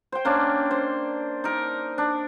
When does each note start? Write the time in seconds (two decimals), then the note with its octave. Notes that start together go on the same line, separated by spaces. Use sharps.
0.12 C5 G5
0.25 A#3 C#4 D4
0.71 C5
1.44 D#4 A#4
1.98 D4